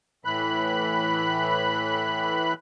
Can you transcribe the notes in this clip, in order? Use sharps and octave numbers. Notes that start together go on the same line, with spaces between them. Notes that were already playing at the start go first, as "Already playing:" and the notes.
A2 E3 B5 F#6